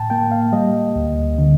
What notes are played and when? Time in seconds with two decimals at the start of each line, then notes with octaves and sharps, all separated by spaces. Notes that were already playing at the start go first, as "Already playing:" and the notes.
Already playing: A2 G5 A5
0.10 A#3 G5
0.31 F5
0.52 G3 D#5
0.96 D2
1.38 D3